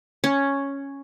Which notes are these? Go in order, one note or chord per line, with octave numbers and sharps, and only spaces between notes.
C#4